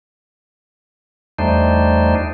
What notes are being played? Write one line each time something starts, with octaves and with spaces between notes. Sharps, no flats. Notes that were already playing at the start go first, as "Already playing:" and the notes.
E2 G3 A3 D4 D#4 C5